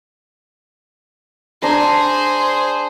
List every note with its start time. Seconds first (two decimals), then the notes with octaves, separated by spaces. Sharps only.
1.62 D4 G#4 C5 A#5